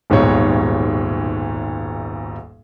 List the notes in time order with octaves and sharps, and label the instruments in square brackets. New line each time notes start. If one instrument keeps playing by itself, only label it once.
[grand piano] D#1 B1 G#2 B2 G3 C#5